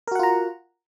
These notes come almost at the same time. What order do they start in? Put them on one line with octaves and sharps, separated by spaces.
A#4 F#4 F#5 F4 A#5